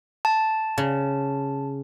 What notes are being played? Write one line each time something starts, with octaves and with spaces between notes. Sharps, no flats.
A5
C#3